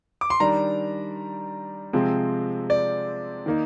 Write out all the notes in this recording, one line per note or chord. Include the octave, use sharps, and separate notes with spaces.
D6
C6
D#3 G3 D4 A#5
C3 F3 G#3 C4
D5
D#3 A#3 D#4